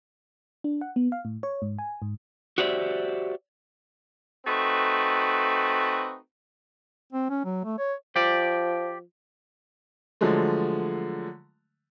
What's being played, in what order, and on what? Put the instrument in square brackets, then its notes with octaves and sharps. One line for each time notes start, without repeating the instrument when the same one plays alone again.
[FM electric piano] D4
F#5
B3
F5
A2
C#5
G#2
G#5
G#2
[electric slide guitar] F#4 G4 C5 D5 E5
[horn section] A3 C4 D#4 F#4 B4
[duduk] C4
C#4
F#3
A3
C#5
[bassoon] F3 [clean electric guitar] G4 D5
[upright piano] D3 F3 F#3 G#3 A3